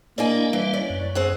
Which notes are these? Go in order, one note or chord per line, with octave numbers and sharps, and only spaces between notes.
A#3 D4 E4 D5 D#5 G#5
E3 G3 F5
C#4 D5
F#2
C4 G#4 F#5